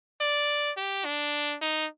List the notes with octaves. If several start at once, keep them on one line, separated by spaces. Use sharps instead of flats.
D5
G4
D4
D#4